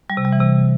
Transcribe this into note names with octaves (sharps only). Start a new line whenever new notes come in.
G3
C3
G3
E3
C3